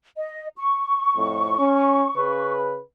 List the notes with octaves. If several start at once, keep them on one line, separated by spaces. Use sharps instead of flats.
D#5
C#6
F2 A2
C#4
C#3 B4